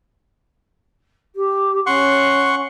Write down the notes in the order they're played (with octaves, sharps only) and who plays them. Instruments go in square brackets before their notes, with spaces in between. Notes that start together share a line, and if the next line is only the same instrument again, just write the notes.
[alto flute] G4
[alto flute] C#4 [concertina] F#5 C6 C#6